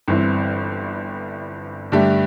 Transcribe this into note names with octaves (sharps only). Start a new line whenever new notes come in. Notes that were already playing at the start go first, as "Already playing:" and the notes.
G1 G2 E3 C4
G2 D3 A3 D4 G4